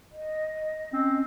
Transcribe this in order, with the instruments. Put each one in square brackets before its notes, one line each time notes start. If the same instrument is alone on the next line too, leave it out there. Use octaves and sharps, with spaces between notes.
[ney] D#5
[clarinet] C4 [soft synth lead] C#4